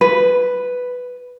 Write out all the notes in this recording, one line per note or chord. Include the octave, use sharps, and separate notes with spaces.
B4